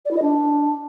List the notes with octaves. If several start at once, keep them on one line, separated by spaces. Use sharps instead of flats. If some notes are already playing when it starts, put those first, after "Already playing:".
D5
E4
D#5
D4